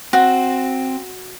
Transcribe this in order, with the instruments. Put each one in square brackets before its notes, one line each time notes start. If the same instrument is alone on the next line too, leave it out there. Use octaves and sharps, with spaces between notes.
[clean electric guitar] C4 [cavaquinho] F#4